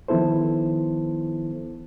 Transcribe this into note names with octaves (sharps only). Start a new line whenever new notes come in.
D#3 F3 B3 E4 A4 C5